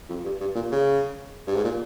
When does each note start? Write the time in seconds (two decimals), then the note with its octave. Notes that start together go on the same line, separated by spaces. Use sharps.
0.09 F2
0.25 G2
0.40 G2
0.55 A#2
0.71 C#3
1.47 G2
1.56 G#2
1.64 A#2